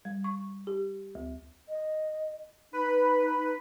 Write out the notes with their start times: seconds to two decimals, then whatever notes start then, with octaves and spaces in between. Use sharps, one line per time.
0.05 G3
0.24 C#6
0.67 G4
1.15 D2
1.69 D#5
2.73 D#4 B4